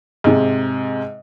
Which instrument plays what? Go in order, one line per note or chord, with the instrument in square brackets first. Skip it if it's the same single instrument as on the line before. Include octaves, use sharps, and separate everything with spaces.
[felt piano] G#2 C3